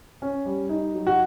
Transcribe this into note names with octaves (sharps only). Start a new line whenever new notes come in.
C#4
G3
D#4
F#3
F#4